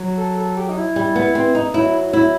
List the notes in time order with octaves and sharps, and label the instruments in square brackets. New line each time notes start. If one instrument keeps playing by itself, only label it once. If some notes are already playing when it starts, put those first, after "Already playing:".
Already playing: [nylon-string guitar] F#3
[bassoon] A4
A4
G4
D#4
E4
[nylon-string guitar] G3
B3
C4
D#4
[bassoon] F#3 [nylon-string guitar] E4
[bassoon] F#3 [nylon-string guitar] E4